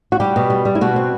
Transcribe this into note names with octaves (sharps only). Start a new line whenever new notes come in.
F#4
G3 G4
B2
G3
G3
E4
B2 F#4
C4